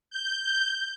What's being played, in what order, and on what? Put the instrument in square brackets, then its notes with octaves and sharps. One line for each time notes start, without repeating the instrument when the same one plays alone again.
[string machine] G6